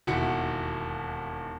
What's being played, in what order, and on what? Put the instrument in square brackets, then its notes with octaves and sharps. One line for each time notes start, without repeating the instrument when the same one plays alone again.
[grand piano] E1 D#2 E4 F#4 C#7